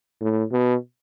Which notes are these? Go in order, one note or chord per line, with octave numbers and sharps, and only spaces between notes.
A2
B2